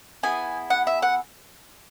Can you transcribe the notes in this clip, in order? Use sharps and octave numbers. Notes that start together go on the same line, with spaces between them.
B3 E4 G#4 G#5
F#5
E5
F#5